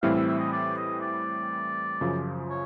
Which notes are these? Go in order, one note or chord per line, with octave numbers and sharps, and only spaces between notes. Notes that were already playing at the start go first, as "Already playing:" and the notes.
A2 E3 G3 C4 E4 F5
E5
E5
D#5
D5
D#5
D5
F#2 C#3 F3
C#5